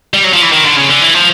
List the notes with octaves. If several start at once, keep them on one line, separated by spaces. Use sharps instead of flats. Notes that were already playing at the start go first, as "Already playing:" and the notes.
G3
F#3
F3
E3
D#3
D3
C#3
D3
E3
F3